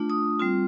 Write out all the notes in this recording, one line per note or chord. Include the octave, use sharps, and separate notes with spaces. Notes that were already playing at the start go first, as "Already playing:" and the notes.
Already playing: A3 D4 F4
D#6
G3 C4 F4